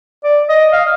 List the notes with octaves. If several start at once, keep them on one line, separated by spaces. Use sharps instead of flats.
D5
D#5
F5